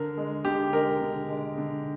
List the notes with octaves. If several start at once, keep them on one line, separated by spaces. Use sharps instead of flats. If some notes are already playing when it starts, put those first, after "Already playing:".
Already playing: D3 A#4
G#3
D3 G4
G#3 A#4
D3
G#3
D3